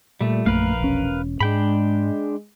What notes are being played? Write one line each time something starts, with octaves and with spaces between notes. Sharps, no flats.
A#2 G3 A3
A#1 F#2 A3 A#3 A#4 B4 F5
E1 C#4
G#2 G#3 D4 G5 B5